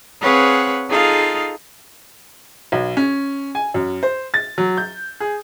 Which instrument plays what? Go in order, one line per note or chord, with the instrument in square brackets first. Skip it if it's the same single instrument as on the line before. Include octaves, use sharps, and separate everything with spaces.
[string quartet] C4 G#4 B4 C#5 F5 F#5
D#4 F4 G#4 A4 F5
[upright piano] B1
C#4
G#5
F#2
C5
A6
F#3
G6
G#4